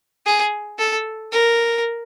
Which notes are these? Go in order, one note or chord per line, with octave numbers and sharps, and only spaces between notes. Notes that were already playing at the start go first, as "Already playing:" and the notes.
G#4
A4
A#4